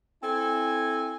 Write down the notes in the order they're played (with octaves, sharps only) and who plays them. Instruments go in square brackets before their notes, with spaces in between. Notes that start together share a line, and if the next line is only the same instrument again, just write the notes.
[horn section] C4 E4 A4 G#5